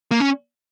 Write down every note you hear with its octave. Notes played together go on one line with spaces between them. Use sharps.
A#3
C#4